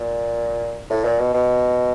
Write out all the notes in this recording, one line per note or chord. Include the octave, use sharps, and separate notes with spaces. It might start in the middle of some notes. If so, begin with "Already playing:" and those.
Already playing: A#2
A2
A#2
B2
B2